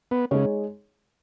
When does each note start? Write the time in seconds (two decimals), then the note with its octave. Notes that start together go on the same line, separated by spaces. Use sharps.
0.11 B3
0.31 C#3 G#3 D#4 G#4 C#5